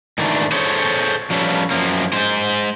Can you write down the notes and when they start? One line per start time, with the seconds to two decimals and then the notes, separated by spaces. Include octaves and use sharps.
0.18 G#2 D#3 E3 A3 D4
0.52 G#4 A4 C5 C#5
1.30 F3 G3 C#4 A4 B4
1.71 F#2 F3 A#3
2.13 G#3 C5